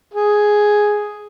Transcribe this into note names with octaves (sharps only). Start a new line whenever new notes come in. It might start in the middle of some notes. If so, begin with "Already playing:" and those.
G#4